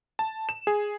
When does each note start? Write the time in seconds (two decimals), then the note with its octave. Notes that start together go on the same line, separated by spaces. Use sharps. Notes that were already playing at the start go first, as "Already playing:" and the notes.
0.19 A5
0.49 E7
0.67 G#4